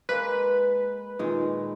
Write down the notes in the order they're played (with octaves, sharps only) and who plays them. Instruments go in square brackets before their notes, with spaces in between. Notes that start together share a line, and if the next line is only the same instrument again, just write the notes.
[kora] G#3 A#3 [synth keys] B4
[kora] A#2 D#3 G#3